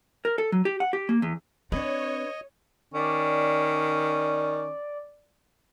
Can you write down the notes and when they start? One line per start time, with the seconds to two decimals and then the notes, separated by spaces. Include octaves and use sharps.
0.25 A#4
0.38 A4
0.52 F#3
0.65 G4
0.80 F#5
0.93 G4
1.09 A#3
1.22 E2
1.72 C4 D4 B4 C#5 D#5
2.94 D#3 C#4 D5